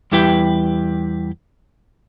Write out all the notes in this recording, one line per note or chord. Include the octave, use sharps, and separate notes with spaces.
E2 G3 E4 G4 B4 G5